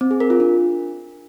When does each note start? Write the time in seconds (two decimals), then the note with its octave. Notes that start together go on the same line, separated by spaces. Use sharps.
0.01 C4
0.11 G#4
0.20 A#4
0.30 F4
0.40 D4